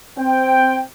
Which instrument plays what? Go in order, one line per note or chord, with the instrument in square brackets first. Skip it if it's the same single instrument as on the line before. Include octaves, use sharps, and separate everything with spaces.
[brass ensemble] C4 G5